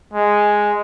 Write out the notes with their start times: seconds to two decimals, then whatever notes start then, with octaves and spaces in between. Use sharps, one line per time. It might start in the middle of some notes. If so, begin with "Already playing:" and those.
0.13 G#3